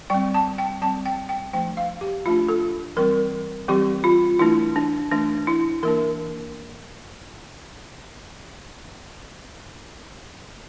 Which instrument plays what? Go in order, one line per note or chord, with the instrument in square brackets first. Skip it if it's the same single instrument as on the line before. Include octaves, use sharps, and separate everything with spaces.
[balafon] G3 C4 G5
A5
G5
G3 C4 A5
G5
G5
F3 A3 D4 G5
F5
G4
F3 A3 D4 F4
A4
E3 G3 C4 A#4
E3 G3 C4 G4
F4
E3 A3 D4 E4
D4
E3 A3 D4
E4
E3 A#3 D4 A#4